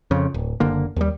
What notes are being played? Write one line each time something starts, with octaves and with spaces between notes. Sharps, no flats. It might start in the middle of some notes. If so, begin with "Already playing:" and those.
F2 C#3
D1
F#1 D3 A#3
D#2 G3